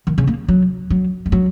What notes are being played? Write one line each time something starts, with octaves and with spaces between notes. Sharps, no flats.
D#3
C#3
A#3
F#3
F#3
G#3
F#3